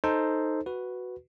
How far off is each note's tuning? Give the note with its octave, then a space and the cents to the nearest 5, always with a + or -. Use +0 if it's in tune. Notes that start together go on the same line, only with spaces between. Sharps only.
D#4 +0 A4 +0 C5 +0
F#4 +0 B4 +0